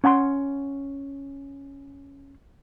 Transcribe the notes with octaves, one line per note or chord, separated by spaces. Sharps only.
C#4 F#5 G#5 C6